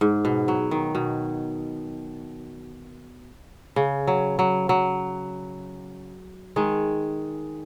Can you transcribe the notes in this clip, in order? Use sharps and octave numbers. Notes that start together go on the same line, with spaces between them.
G#2
B2
F#3
D#3
B2
C#3
F#3
F#3
F#3
D#3 G#3